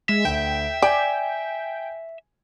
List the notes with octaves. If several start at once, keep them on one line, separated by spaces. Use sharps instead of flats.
G#3 E5
D2 G5
D5 G5 G#5